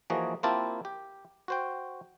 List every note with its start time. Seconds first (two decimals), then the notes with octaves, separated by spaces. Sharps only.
0.10 E3 F3 A#3 F#4 G#4 D#5
0.43 A#3 C4 E4 F4 G4 A5
0.85 G4
1.48 F#4 C5 G5